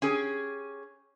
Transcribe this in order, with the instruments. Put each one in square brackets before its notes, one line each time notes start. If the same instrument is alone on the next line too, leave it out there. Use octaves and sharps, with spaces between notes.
[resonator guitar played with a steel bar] C#4 G4 G#4